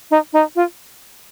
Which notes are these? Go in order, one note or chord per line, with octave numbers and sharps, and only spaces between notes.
D#4
D#4
F4